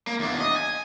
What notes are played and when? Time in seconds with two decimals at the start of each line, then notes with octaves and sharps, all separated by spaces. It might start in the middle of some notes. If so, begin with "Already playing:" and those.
0.07 A#3
0.19 E2 D4
0.40 D#5
0.56 G#5